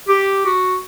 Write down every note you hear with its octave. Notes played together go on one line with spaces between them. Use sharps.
G4
F#4